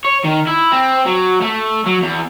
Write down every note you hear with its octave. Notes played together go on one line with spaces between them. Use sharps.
C#5
D#3
E4
C4
F#3
A3
F#3
E2